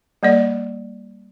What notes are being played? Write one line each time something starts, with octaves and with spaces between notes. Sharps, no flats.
G3 A#3 D5